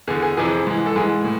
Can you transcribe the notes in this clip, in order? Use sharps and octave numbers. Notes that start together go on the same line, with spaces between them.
E2 D3 G#4
G#4
F2 C3 E3 G#4
G#2 E3
A4
G#2 E3 G#4
A2